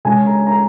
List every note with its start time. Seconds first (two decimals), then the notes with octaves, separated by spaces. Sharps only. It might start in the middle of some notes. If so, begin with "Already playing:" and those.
0.05 C#3 G#3 C#4 G#5
0.26 A#5
0.47 A#5